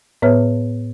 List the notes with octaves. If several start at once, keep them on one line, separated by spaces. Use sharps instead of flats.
A2 B3 B4 C#5 E5 F6